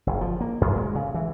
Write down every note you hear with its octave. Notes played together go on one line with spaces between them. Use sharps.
F#1
F3
A#3
F#2
G#3
C#3
E3